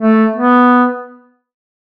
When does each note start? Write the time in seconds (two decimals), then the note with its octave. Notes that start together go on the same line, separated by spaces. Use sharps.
0.01 A3
0.36 B3